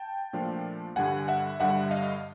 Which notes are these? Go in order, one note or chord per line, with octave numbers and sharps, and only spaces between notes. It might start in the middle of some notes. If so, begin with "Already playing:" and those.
Already playing: G5 A5
A#2 F3 A3 D4 F4
G2 D3 G3 F#5 G#5
E5 F#5
G2 D3 G3 E5 F#5
D#5 F5